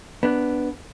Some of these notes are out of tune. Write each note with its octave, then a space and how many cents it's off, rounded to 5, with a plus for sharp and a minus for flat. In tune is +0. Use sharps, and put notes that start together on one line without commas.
B3 +0 D4 +0